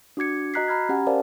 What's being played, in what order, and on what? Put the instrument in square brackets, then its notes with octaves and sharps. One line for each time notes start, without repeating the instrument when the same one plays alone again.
[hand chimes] D4 F#4 D6 G#6 C#7
F#4 D#5 A#5 F#6 B6 C7
A#5 B5 F6 G#6
C#4 G4 F#5 G#5
A#4 C5 D5 F5 A5